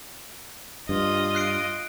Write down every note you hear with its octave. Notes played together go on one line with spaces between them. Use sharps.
G2 F4 D#5
F#6 C7 D7